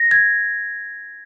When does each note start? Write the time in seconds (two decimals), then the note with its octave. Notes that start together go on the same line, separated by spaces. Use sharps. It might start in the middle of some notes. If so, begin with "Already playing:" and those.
Already playing: A#6
0.11 G#6